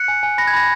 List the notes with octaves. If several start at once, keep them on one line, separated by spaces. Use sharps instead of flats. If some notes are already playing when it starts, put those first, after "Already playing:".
Already playing: F#6 C#7
G#5
G#5
B5 A#6
G#6
B5 A#6